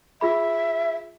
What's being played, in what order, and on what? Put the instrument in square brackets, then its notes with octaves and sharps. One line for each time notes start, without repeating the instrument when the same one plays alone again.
[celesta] F4 G#4 B5 [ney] E5